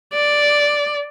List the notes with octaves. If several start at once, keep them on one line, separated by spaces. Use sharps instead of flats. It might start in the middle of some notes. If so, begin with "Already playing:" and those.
D5